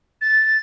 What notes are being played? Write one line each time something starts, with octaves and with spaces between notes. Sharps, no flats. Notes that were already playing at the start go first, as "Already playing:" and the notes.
A6